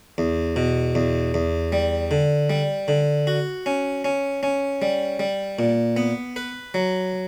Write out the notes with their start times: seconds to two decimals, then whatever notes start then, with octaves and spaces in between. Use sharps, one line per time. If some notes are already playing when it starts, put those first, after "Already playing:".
0.18 E2
0.56 B2
0.95 E2
1.34 E2
1.72 G3
2.11 D3
2.50 G3
2.88 D3
3.27 F#4
3.66 C#4
4.05 C#4
4.43 C#4
4.82 G3
5.19 G3
5.59 A#2
5.97 B3
6.36 B4
6.74 F#3